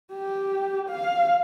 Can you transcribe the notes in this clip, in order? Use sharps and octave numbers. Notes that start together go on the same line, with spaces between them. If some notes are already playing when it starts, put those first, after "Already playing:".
G4
F5